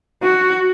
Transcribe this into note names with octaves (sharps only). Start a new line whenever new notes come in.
F#4